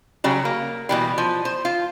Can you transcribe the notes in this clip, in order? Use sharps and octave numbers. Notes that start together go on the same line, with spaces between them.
C#3 F#3 G3
A#3
B2 E3 G3
F3
C5
F4